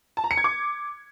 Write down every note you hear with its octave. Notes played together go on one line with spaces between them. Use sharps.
A5
A#5
C#7
G#6
D6